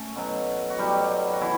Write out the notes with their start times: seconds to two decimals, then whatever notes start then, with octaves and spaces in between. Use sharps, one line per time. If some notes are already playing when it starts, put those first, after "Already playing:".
Already playing: A3 C#4 A4
0.16 B2 F#3
0.70 F#4
0.78 B2 F#3 G3 G4
1.33 F#4
1.41 B2 E3 E4